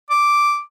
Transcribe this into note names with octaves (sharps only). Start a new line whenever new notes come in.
D6